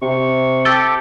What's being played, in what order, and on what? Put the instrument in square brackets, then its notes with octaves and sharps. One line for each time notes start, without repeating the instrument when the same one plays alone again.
[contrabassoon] C3 [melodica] C#6
[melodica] G4 A4 G5 [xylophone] E6 A6 G7